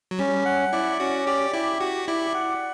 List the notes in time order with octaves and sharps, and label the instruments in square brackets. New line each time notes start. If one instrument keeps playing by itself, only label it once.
[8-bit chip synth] F#3
[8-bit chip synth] G3 [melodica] C#4
[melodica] F#5
[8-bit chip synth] E4 [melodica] D5
[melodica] C#4 [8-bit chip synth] F#4
[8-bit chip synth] G4 [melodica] D5
[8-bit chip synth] E4 [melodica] G4
[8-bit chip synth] F#4 [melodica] G4
[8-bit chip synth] E4 [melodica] D5
[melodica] F#5